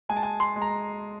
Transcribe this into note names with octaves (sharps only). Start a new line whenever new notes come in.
G#3 G#5
A5
G#5
C6
G#3
A#5